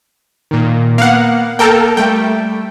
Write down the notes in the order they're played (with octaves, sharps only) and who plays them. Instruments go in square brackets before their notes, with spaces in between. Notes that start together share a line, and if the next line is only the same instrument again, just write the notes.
[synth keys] A#2 D#3
[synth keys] A#3 B3 [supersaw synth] F5 F#5
[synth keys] A#3 [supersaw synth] A4 A#4 G5
[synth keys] G3 A3 [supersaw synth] G5